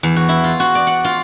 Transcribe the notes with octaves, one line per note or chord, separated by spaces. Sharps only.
E2
F#4
E4
F4
F#4
D5
F#5
F4